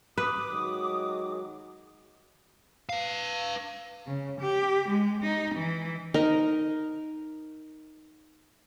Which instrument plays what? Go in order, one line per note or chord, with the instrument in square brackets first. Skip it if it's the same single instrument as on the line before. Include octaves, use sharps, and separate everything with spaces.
[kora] B4 [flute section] D6 D#6
[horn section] D#3 F#3 G#3
[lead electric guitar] B4 F5
[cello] C#3
G4
G#3
D#4
E3
[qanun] D#4 A#4 D#5